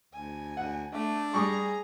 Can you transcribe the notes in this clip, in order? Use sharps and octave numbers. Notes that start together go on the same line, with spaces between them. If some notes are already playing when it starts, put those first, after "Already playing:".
D2 G#5
D2 F#5
A3 D4
G3 G#4 A#5 C#6